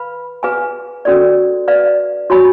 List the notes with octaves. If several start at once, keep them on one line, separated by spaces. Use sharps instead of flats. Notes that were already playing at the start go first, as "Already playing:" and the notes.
Already playing: B4 F5 B5
G#4 B4 F5 G#5
C#4 F#4 A4 D5
B4 D5 F5
F#4 C#5 G#5 B5